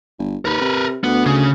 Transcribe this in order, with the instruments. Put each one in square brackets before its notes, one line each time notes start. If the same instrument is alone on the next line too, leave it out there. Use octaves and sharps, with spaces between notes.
[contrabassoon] G1
[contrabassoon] D#2 [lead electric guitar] A#4 B4
[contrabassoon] C3
[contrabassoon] D2 [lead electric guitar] B3
[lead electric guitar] C#3